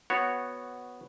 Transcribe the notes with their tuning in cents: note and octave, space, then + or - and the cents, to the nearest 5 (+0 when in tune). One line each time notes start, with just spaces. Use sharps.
B3 +0 F#4 +0 C#5 -5